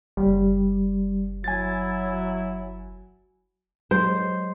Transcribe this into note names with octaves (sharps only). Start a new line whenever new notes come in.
F#1 G3
F#3 E4 G#5 A6
F#3 G#3 C5